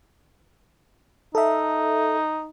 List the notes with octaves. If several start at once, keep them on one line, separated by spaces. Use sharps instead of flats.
D#4 A4 E5